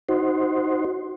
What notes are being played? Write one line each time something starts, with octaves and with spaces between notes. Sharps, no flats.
D#4 F#4 C5